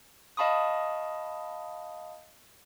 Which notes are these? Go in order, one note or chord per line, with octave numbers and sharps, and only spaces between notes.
D#5 F5 A5 B5 C#6 D#6